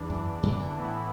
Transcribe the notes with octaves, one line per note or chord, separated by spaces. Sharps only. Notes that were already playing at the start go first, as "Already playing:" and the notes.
Already playing: E2 E3 D4
F#2
F#2
D3
A2 E3 B3 E4